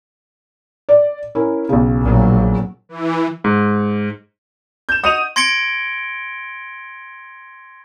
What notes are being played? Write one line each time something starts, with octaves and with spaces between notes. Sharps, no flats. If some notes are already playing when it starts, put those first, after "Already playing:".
D5
C#4 E4 A#4
B1 C#3
A#1 F#3
E3
G#2
G6 E7
F#4 D#5 F#5 D#6 D#7 F7
C6 G#6 A#6 C#7 D7 G7